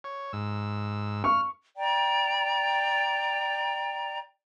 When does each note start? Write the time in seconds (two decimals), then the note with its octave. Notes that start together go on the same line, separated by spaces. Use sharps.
0.04 C#5
0.33 G#2 E6
1.24 C#6 F6
1.77 D5 G5 A#5